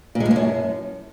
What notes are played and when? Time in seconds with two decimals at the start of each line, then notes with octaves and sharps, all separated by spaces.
0.15 A#2
0.20 G#3
0.26 A2
0.31 G#3
0.36 F#2